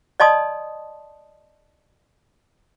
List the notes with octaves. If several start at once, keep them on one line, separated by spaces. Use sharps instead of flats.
D5 D#5 A5 C6 D#6